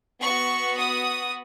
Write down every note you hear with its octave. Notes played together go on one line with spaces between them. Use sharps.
B3 F#4 C#6
D#6